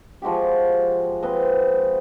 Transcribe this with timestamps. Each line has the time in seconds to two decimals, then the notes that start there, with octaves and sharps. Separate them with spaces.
0.22 F3 G#3 F#4 G4
1.22 C4 B4 D#5